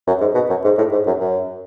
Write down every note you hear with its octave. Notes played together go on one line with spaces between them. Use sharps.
F#2
G#2
B2
F#2
G#2
A2
G#2
F#2
F#2